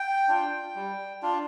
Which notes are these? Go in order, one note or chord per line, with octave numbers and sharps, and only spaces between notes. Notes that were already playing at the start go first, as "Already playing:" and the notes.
Already playing: G5
D4 F4
G3
D4 F4